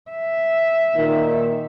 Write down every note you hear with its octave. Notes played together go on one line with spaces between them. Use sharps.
E5
A#2 D#3